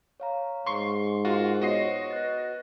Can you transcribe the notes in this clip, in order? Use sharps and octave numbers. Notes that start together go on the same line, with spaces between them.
C#5 F5 A#5
G#2 C6 C#6 C7
F4 F#4 A#4 C6
B3 F#4 C5 C#5 D#5 C7
B4 F#6 A6